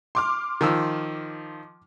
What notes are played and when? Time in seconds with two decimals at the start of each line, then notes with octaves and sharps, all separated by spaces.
0.15 C6 D6 F6
0.61 D#3 F3 E6